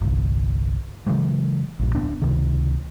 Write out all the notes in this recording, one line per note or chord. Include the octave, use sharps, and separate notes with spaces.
G1 C2
C#3 E3 F#3 G#3
A#1 G2
D1 B2 B3 D4
C#2 C3 D#3